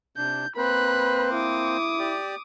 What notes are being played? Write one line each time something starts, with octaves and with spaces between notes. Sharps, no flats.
C3 D4 G6
A#3 C4 B4 C5 B5 F#6
E4 D6 D#6
G4 D5